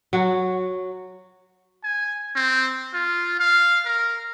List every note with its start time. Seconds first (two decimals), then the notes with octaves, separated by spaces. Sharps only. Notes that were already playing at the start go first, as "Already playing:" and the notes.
0.13 F#3 F#4
1.84 G#5
2.36 C4
2.94 F4
3.40 F5
3.85 A#4